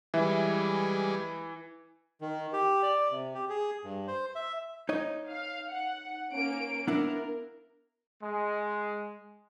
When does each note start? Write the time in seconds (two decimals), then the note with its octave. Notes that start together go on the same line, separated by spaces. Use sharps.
0.14 E3 G3 G#3 E5
2.21 D#3
2.53 G4
2.83 D5
3.11 C3
3.34 G4
3.50 G#4
3.84 G2
4.08 C5
4.35 E5
4.89 D#4 C#5 D#5
5.29 F5
5.70 F#5
6.31 A#3 C#4 D7
6.87 B3 D4 E4 A#4
8.23 G#3